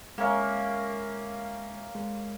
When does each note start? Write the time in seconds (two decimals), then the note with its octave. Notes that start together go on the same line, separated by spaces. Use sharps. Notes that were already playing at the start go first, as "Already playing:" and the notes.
0.18 G#3 A#3 C#4 E5
1.95 G#3